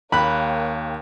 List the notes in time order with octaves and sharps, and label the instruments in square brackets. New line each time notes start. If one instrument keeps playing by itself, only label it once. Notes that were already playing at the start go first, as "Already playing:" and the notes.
[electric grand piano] D#2 G5 F#6 [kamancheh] A#3 C#5 [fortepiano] B5